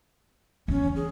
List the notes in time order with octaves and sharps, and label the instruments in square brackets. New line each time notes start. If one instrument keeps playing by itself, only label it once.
[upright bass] E2 [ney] C#4
[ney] G#4